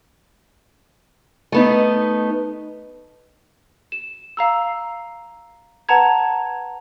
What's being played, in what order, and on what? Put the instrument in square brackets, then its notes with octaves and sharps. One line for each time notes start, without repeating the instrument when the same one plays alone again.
[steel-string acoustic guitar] A3 B3 D#4
[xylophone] E7
F5 A#5 E6
B4 F#5 A5 A#5 G#6